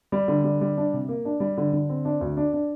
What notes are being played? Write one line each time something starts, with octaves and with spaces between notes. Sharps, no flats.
G3
D3
G3
G3
D4
C3
A#3
D4
G3
D3
D3
C4
D4
D2
D4
D4